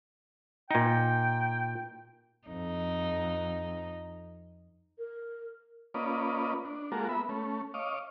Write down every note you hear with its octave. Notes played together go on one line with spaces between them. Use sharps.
A#2 D#4 G5
F2 D#4
A#4
A#3 C#4 F4 B4 D5 D#5
D4
G#3 A#3 F4 F#4 A4 A#4
B3 E5 B5
A3 C#4
C#5 D#5 F5 D6